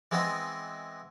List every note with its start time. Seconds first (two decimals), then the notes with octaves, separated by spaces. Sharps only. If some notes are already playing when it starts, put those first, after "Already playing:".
0.11 E3 G#3 B3 C4 C5 D#5